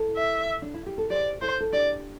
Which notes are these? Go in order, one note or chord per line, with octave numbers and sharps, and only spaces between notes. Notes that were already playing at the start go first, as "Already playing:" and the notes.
Already playing: E4 A4
E5
D4
E4
G4
A4
G4 C5 D5
E4 A4 C5
A4
D4 G4 D5